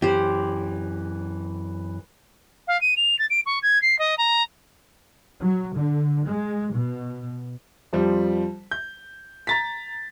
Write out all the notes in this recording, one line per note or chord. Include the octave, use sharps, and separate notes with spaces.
F#2 E3 G4 C5
F5
D#7
F7
A6
D7
C#6
G#6
C7
D#5
A#5
F#3
D3
G#3
B2
F2 F3 G3
G6
A#5 A6 B6